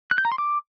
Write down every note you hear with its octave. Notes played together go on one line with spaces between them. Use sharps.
F#6
G6
A#5
C6
D6